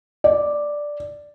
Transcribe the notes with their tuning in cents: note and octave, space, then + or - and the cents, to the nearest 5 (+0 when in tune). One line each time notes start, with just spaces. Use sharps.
D5 +0